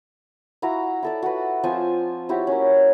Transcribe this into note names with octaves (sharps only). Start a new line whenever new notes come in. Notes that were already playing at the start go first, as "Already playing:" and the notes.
E4 F#4 F5 A#5
E4 A4 D5
F#4 B4
F3 C4 F4 G#5
E4 F#4 G4 C#5
A#3 C#4